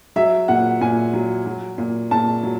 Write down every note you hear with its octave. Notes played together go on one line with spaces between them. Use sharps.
F#3 E5
A#2 F#5
A#2 G#5
F#3
F#3
A#2
A#2 A5
F#3